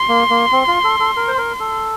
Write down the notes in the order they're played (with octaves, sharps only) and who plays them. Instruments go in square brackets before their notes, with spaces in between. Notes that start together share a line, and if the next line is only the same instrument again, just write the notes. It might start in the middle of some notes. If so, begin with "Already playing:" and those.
Already playing: [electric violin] C6
[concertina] A#3
A#3
C4
F4
A4
A4
A#4
C5
A#4
A4